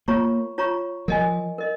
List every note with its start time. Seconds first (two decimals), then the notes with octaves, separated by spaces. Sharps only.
0.08 A#3 F4 C#5 A#5 C#6
0.58 F4 C#5 A#5 C#6
1.08 F3 A#4 D#5 G#5
1.58 A#4 D#5